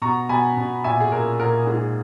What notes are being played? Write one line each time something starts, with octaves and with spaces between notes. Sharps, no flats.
B2 A#5 C#6
B2 G#5 B5
B2
A#2 E5 G#5
G#4
A#2 A#4
A#2 A#4
G#2 G#4